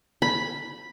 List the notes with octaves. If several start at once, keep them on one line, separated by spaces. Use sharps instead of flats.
B5